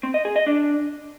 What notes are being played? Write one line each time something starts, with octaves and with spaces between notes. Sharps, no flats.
C4
D#5
G#4
D#5
D4